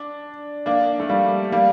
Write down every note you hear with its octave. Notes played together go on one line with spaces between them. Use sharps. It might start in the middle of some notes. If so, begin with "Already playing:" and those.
Already playing: D4
A#3 D4
A3
G3 A#3
G3 A#3